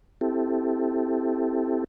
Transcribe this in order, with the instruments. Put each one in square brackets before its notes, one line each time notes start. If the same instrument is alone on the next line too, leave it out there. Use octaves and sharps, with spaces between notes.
[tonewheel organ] C4 E4 G4 A4